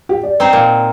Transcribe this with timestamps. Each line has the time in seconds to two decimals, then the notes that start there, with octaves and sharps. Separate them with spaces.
0.09 G4
0.23 D5
0.40 C4 D#4 C5
0.53 A#2